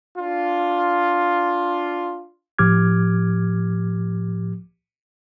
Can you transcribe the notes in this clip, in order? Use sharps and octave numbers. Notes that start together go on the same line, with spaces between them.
D4 F4
A2 F3 G4 D6 F6 G#6